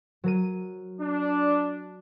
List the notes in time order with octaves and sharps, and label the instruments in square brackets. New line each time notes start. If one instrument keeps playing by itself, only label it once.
[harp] F#3 A#4 D#7
[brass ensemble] D4